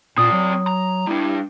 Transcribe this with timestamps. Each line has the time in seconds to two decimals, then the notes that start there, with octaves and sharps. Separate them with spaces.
0.18 A#2 C4 D5 D#6
0.32 F#3
0.67 A#5
1.07 G3 D4 E4